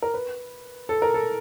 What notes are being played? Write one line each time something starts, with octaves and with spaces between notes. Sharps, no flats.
A#4
B4
A4
A#4
A4